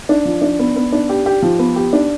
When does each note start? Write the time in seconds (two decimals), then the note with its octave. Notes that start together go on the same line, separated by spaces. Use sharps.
0.09 D4
0.25 F3
0.42 D4
0.59 B3
0.76 B3
0.92 D4
1.09 G4
1.26 G4
1.42 F3
1.59 B3
1.76 G4
1.93 D4